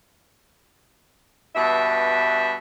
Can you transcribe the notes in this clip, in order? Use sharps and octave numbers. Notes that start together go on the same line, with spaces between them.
G2 B2 E5